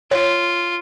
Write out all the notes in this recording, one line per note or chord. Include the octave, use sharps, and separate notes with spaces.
F4 C#5